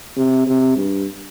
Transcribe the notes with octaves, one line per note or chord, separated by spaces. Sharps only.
C3
C3
G2